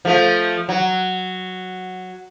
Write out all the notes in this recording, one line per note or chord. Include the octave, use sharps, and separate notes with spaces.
F3 A3
F#3